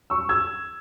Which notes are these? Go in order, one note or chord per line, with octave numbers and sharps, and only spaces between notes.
C#6 E6
E6 G#6